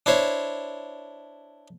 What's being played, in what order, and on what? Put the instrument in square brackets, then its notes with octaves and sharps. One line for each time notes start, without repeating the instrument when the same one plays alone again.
[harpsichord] D4 E4 C5 C#5